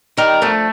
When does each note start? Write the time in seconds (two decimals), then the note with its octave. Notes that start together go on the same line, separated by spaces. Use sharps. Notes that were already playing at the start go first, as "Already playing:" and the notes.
0.17 D#3 G3 A#4
0.42 D3 F3 A3